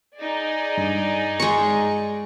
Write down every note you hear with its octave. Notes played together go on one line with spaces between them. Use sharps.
D#4 G#4 D5
G2
G#3 C#6